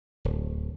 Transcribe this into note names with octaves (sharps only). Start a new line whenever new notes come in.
D1